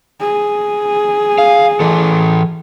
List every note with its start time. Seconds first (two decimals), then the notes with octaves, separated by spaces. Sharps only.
0.21 G#4
1.38 F5
1.80 E3 A4